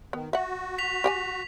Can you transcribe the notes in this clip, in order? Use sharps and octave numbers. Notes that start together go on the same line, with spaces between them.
D#3 B3
F#4 E5 F#5
B6 F7
G4 G5 G#5 F7